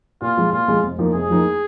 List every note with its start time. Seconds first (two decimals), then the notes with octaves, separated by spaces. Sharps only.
0.22 A#2 F4
0.37 F3 G#3
0.53 A#2 F4
0.68 F3 G#3
0.83 F1
0.99 F2 F3 A#3 D#4
1.14 F1 G#4
1.29 F2 F3 A#3 D#4